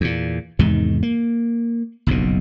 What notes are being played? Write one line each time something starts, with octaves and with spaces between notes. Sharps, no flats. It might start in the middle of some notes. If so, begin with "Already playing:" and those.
E2 A#2
E2 G#2 C3 D#3
A#3
F#1 B1 F2 B2